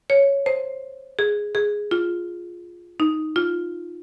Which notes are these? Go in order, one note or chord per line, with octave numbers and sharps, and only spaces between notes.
C#5
C5
G#4
G#4
F4
D#4
F4